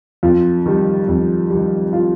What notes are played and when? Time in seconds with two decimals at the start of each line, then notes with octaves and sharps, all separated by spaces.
0.23 F2 F4
0.66 D#3 G3
1.08 F2
1.50 D#3 G3
1.93 F4